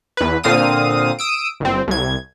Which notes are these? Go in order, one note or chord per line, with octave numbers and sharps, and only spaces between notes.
E2 B4
A#2 D3 C4 F5 D#6 D#7
D#6 E6 D7
G1 C4
C2 G#6